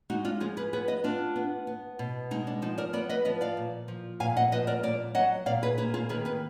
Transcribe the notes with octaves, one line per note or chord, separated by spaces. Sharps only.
G#3 D#4 F#4
D4 F4
F3 F4 G#4
G#4 B4
B3 G#4 B4
B4 D#5
B3 D4 F4
B3
B3
B2
G#3 D#4
D4
F3 D#4
A#4 D5
B3 A#4 D5
B4 D#5
F3 B4 D#5
D5 F5
A#2
F3
A#2 F5 G#5
D#5 F#5
F3 B4 D#5
A#4 D5
A#2 A#4 D5
F#3 D#5 F#5
A#2 D5 F5
G#4 B4
A#3 G#4 B4
F4 G#4
D#3 G#4 B4
G#4 B4